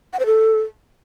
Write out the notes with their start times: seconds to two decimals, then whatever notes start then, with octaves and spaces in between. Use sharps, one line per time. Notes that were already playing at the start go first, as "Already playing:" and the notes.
0.13 F#5
0.19 C5
0.26 A4